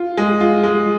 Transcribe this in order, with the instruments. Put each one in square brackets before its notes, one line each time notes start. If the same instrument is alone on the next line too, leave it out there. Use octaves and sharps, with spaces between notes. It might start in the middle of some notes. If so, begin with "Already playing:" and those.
Already playing: [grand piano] F4
G#3
F4
G#3